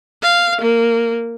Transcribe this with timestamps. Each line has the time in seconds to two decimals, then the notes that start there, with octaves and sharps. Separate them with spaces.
0.22 F5
0.61 A#3